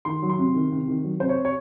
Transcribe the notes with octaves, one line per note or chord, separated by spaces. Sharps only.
D#3 C6
F#3
C6
C3
D#3
C3
D#3
F#3
C3 C5
C#5
C3
C#5